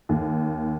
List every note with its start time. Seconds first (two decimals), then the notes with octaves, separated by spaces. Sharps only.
0.09 D#2